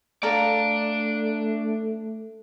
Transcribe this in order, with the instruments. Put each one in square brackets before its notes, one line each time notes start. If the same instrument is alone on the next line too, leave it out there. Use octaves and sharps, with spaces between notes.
[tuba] A3 [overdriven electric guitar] D4 D5 [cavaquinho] A4 F5 A#5